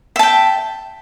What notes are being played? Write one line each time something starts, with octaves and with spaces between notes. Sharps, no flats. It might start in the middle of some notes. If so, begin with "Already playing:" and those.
E5 G5 A5